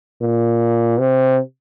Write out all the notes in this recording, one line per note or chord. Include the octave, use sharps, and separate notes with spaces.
A#2
C3